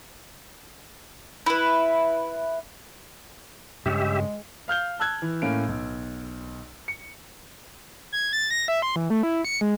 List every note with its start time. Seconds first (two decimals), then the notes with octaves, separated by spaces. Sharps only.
1.46 E4 B4
3.86 G2 C#3 G#3 G4 E5
4.68 F5 F6 G6 G7
5.00 A5 E6 F#6 G#6
5.22 E3
5.42 A2 A#3 C#4 F5 D7
5.68 B1
6.88 C#7
8.12 G#6
8.33 A6
8.51 A#6
8.68 E5
8.82 C6
8.96 E3
9.10 A3
9.23 E4
9.45 C#7
9.61 G#3